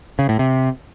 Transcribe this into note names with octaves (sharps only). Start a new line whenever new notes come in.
C#3
A2
C3